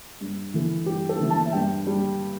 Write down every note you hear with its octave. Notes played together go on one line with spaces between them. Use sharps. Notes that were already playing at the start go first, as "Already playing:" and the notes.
G2
E3 A3
G2 G4
A4
E3 A3
A5
E5
G2 G5
G3